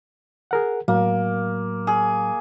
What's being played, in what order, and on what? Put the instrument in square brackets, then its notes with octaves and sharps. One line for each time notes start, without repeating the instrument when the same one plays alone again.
[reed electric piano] G#4 A#4 F#5
[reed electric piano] A2 F#3 [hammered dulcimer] A#3
[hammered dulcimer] G#4